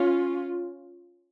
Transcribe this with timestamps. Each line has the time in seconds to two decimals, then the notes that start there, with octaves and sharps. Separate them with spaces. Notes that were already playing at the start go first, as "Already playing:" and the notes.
Already playing: C#4 F4